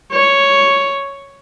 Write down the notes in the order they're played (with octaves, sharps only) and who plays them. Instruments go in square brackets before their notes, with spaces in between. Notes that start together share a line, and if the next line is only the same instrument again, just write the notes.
[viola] C#5